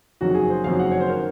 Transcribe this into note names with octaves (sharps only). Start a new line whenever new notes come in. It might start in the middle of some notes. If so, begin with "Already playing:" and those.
F#1 F2 D#3 F#3 F#4
G#4
C5
F#1 F2 D#3 F#3 F5
F#5
C#5
C5
D#3 A#4